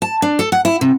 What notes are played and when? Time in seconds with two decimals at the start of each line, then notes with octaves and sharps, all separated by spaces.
0.02 A5
0.22 D4
0.39 A4
0.52 F#5
0.65 E4
0.81 C3